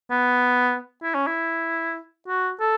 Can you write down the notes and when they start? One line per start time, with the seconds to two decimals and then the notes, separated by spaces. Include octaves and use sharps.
0.11 B3
1.03 E4
1.15 C#4
1.27 E4
2.28 F#4
2.60 A4